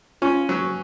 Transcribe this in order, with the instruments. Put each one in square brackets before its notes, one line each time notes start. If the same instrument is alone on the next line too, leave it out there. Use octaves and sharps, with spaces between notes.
[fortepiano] C#4 [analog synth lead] F4
[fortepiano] F#3